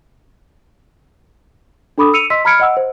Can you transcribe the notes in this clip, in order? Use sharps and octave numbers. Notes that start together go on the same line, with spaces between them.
D4 A4 B5 D6 D#6
E6 C#7 D#7 F7
D#5 C6 E6 B6
A#5 B5 F6 G#6 C#7 D7
D#5 F#5 E6
C5